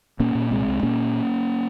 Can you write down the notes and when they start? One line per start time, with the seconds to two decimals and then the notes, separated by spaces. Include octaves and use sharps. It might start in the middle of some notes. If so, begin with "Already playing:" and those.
0.20 A#2 A#3 C#4
0.35 A#2
0.51 C2 G#3 C4
0.67 C2
0.83 A#2 A#3 C#4